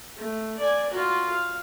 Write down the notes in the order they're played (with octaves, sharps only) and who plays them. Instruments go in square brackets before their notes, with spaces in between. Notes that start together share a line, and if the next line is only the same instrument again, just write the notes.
[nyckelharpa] A3
D5 G#5
F4 F#4
F5